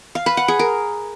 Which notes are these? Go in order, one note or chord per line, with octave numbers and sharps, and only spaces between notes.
F5
B4
F#5
G#4
A#4